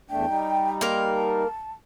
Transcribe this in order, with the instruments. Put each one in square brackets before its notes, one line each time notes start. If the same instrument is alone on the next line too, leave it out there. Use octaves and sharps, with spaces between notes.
[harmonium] E2 A3 D4 [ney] G5
[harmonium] G3 D#4
[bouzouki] A#3 A#4 [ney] C6
[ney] A5